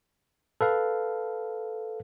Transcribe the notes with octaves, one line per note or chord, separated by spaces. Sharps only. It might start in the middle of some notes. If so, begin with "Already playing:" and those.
A4 B4 F5